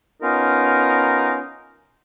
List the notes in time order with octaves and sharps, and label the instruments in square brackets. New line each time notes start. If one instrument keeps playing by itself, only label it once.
[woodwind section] B3 C#4 D#4 F4 A#4